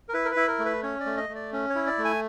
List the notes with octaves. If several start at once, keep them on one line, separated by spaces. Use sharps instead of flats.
A#4
E4 B4
A#4
B4
E4
A#4
A3
B4
C#4 C#5
D5
A3
D#5
A3
D5
C#4
C#5
E4
D5
A3
G#5